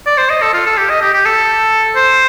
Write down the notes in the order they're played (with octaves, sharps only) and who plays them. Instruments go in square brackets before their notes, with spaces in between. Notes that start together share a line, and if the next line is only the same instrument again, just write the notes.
[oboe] D5
C5
D#5
A4
F4
A4
G4
D#5
G4
G4
A4
C5